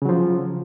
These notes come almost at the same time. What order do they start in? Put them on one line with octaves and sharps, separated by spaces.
C#3 F#3 F3